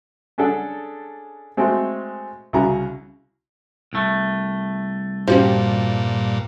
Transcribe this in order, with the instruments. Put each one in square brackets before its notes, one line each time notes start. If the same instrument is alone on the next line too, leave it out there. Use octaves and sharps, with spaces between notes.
[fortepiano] C#4 D4 G#4 A4 F#5
G#3 A3 C4 F#4
C2 C#3 E4 F#4 A#5
[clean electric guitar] C2 A3
[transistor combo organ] G2 A#2 [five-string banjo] F3 [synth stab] C#4 F#4 G4